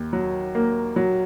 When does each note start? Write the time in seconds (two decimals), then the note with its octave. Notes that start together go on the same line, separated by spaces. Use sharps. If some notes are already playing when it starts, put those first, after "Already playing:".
Already playing: D#2
0.13 F#3
0.55 A#3
0.96 F#3